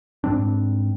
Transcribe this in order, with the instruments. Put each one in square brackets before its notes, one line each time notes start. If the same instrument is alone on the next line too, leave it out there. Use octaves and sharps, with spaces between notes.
[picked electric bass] G#2 G3 C4 D4